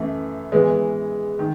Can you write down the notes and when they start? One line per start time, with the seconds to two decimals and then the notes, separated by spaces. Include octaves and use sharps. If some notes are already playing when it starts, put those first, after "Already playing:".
Already playing: F#2 E3 A3 E4
0.52 E3 G#3 B3
1.39 D#3